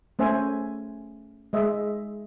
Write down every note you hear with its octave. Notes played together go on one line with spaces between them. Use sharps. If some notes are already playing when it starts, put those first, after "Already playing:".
A3 C#4 C5 E5 G#5
G#3 D#5 E5